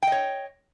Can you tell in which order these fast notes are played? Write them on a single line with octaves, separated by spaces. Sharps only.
G5 D#5 C#5